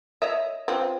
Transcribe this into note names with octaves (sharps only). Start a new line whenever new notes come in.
C#5 D#5 E5
C4 F4 B4